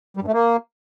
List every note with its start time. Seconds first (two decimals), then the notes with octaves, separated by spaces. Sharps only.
0.17 G3
0.22 G2
0.28 A3
0.33 A#3